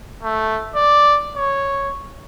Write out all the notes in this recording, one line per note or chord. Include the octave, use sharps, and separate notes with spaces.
A3
D5
C#5